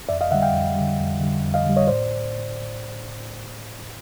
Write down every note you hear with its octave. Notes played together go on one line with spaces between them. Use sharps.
F2 D5 E5
D#5 F5
D3 G3 E5 F#5
F5 G5
F2
D3 G3
F2
D3 G3
F2
D#5 F5
D3 G3
C#5 D#5
A2 C5 D5